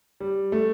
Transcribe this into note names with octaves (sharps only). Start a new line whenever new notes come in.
G3
A3